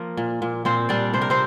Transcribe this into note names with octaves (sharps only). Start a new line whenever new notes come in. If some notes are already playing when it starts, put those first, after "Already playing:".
Already playing: F3 A#3 A#4
A#2
A#2
A#2 C4 C5
G3 D4 D5
C3 C5
A#4
C4 C5